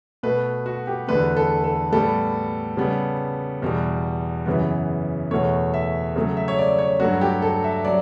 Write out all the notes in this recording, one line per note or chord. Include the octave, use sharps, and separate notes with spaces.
B2 A3 B4
F#4
G4
E2 D3 A3 B4
A4
A4
A2 G3 B3 A4
C#3 G3 B3
E2 B2 G3
F#2 C#3 E3 B3
E2 B2 A3 C#5
E5
C#3 F#3 A3
E5
C#5
D5
C#5
G2 F#3 A3 F#4
G4
A4
E5
F#3 D5